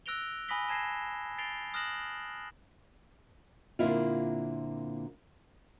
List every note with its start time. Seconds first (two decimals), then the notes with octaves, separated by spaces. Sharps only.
0.06 E6 F#6 A#6 D7 F7 G7
0.48 G#5 B5 D#6 A#6 B6 G7
0.69 G#5 A5 G#6 A#6 C7 E7
1.38 A6 C7 D7 F7 G7
1.74 D#6 F6 F#6 A#6 E7 F#7
3.79 A#2 D3 A#3 C4 E4 F4